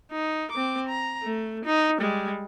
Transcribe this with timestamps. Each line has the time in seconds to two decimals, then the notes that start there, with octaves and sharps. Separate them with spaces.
0.11 D#4
0.52 C4 D6
0.89 A#5
1.23 A3
1.65 D#4
1.98 G3 G#3